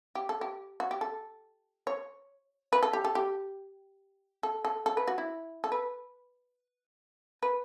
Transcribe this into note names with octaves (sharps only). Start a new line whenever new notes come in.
G4
A4
G4
F#4
G4
A4
C#5
B4
A4
G4
A4
G4
A4
A4
A4
B4
F#4
E4
A4
B4
B4